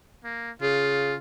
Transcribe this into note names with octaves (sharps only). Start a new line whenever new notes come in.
A#3
C#3 F4